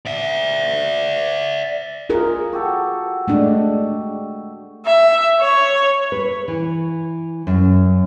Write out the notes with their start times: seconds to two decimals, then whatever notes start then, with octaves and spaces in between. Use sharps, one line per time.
0.06 D5 E5
2.10 F4 G#4 A#4
2.53 F#4 G4 A4
3.28 G#3 A3 D4
4.86 E5
5.40 C#5
6.12 B4
6.48 E3
7.47 F#2